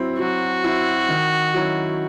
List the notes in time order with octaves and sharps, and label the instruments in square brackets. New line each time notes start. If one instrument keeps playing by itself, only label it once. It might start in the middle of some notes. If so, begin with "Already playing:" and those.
Already playing: [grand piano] F#3 C4 E4
[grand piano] F#3 [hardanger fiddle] F#4
[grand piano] C4 E4
D#3
F#3 C#4 E4